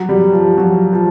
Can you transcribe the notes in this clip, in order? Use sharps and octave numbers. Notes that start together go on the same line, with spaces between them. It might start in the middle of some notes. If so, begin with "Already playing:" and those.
Already playing: F#3
G3
F3
F#3
F3